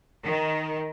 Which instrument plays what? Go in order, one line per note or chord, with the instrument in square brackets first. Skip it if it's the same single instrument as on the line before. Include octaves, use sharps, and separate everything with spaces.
[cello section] D#3